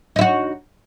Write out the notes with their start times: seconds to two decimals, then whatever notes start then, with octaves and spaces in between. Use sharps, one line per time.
0.16 D#4
0.19 E4
0.21 F#4